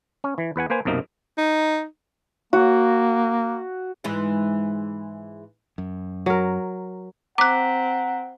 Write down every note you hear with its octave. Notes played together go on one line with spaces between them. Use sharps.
C#4
E3
E2 B4 F#5 G#5
A#3 B4 C5 G#5
B1 F#2 C3 A#3 D#4 A#4
D#4
A#3 F#4
G#2 E3 G#3
F#2
F#3 A#4
C4 F#5 A#5 D6 F#6 B6